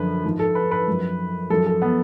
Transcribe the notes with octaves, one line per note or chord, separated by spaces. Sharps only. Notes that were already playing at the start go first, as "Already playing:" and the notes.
Already playing: F#2 D3 F3 B4
G#2 F3
A4
B4
B4
F#2 F3
F#2 F3 A4
A4
B3